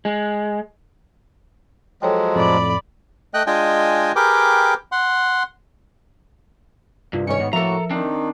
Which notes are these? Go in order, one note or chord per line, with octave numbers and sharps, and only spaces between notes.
G#3
F3 F#3 G#3 A4 C#5 G5
F2 A2 D5 B5
A3 D#5 G5 F#6
G#3 D4 F4 D#5 G5 G#5
G4 G#4 A#4 B4 G5 D6
F#5 C6
C2 G2 F4
D#3 C#4 C#5 C#7
G#2 B3
A2 F3 A#3 F#4 A4 A#4 E5 A#5
D#3 C4 D4 D#4